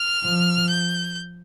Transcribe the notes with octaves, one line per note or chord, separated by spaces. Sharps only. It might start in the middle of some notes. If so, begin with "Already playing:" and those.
Already playing: F6
F3
G6